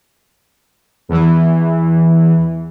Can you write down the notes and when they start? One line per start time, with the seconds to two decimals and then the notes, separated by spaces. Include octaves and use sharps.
1.09 E2 E3